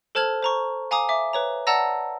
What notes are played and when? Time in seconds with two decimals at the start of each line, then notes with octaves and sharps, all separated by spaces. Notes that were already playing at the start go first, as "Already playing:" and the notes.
0.15 A4 C5 A5 F6 G#6 F#7
0.42 C5 A#5 C#6
0.91 F5 G#5 A#5 D6 D#6
1.09 E5 D6
1.33 B4 C#5 A#5
1.67 D5 F#5 A5 A#5 E6 A#6